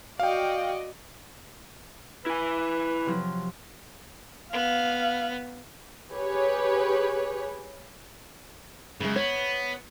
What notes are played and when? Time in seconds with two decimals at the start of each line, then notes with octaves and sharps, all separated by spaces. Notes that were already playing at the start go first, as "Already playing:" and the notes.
0.19 F#4 D5 D#5 F5 G5
2.26 E4 B4 G#5
3.06 C3 F3 F#3
4.53 B3 F5
6.12 G4 G#4 B4 C#5
9.00 F#2 C#3 G#3
9.16 B3 C#5